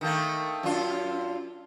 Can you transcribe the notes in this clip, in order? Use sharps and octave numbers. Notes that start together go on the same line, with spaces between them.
D#3 A3 A#3
F#2 D4 F4